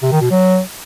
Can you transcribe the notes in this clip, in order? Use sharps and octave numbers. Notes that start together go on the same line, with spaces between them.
C3
D#3
B2
F#3